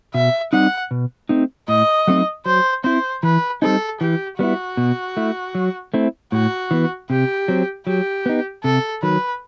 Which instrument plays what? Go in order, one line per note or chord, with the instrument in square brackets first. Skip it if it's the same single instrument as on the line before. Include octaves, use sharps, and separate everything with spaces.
[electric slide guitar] B2 [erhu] E5
[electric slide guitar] G3 C4 D#4 [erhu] F#5
[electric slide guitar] B2
A3 C4 D#4
[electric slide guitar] A2 [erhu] D#5
[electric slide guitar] F#3 A3 C4 D#4
[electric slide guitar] F#3 [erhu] C5
[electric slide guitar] C4 E4 [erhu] C5
[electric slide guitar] E3 [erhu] B4
[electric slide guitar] G3 C4 D#4 [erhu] A4
[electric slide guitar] E3 [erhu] G4
[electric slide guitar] G3 B3 E4 [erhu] F#4
[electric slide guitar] B2
A3 E4
F#3
A3 C4 E4
[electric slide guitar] A2 [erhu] F#4
[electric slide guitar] E3 B3
[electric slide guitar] C3 [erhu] G4
[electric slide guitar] F#3 C4
[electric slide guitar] F#3 [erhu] G4
[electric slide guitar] B3 D#4
[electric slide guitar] C3 [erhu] A4
[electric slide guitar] D#3 F#3 [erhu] B4